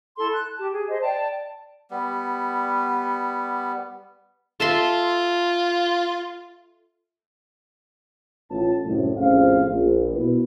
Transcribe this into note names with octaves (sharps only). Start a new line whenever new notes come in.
E4 A4 C6
F#6
G4 A5
G#4
C5 D#5
D5 G5 A5
G3 B3
F4 A4 E5 C6
A1 F4 A5
C2 F#2 A2
A#1 F2 A2 C#4 C5 F5
A#1
B2 B3 E4 B4